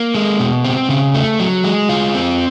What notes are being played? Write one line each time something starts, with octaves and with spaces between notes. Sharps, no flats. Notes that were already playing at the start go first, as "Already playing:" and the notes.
Already playing: A#3
G#3
B2
C4
C#3
A3
F#3
G#3
F4
C4